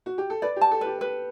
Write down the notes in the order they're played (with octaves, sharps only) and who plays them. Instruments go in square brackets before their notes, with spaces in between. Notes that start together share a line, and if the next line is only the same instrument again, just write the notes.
[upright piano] F#4
G4
A4
[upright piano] B4 [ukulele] D5
[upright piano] G4
[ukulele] A5
[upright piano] A4
[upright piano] G4 [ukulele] B4
[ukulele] B4